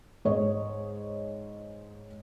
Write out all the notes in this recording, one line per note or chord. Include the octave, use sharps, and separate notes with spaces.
G#2 C#5 D#5